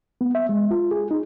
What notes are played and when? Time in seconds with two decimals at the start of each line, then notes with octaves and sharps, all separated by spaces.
0.21 B3
0.35 E5
0.49 G#3
0.71 F4
0.91 G#4
1.11 D#4